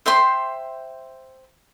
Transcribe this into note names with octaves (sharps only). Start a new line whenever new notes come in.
C5 E5 G5 C6